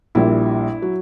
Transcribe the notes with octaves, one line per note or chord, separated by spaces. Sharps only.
A#1 A#2 G3 E4
F#3